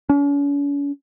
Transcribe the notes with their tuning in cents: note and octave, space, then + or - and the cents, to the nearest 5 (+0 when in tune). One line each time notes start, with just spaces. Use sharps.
C#4 +45